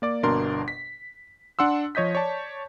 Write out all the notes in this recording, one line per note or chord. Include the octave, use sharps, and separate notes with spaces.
A#3 D5 D6
G1 B2 D4 A#4 D5 C6
B6
D4 F#5 C6 E6
F3 C#5 D#5 G6 B6
C#5 D5 A5